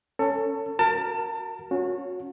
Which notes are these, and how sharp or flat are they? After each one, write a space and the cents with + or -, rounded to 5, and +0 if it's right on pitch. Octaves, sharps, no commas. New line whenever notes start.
C#4 +5 A4 +25
F#4 +0 A#4 +0 A5 +30
C#4 +0 F#4 -30